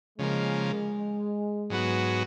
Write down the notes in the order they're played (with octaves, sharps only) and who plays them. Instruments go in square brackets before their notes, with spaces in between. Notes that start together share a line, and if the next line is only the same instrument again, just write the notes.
[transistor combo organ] C#3 F3 A#3 [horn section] G#3
[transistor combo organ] G#2 F#3 B3 F#4